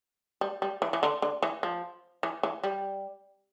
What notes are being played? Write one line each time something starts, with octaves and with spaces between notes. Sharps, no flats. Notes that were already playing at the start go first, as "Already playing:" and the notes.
G3
G3
E3
E3
D3
D3
E3
F3
E3
E3
G3